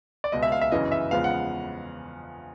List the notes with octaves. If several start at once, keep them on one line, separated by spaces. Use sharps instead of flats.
D5
C#2 B2 G#3 D#5
E5
F5
E5
G1 F#2 C#3 E3 D#5
E5
E2 C#3 F3 G#3 B3 F5
F#5